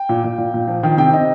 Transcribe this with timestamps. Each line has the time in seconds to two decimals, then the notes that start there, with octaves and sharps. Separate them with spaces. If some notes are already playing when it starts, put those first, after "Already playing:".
Already playing: G5
0.09 A#2
0.24 A#2
0.38 A#2
0.54 A#2
0.67 F3
0.83 D#3 G5
0.97 C3 G5
1.13 C3 D#5